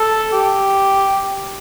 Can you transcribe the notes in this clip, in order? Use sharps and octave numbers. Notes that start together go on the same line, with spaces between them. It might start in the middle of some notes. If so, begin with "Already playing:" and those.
Already playing: A4
G4